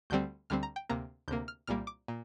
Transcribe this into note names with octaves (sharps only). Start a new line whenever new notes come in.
D2 D3 G3 C4 G6
D2 D3 G3 C4 F6
A#5
G5
D2 C3 A#3 A#5
D2 C3 A#3 G6
F6
C2 A#2 G3 A#3 F6
D6
A#2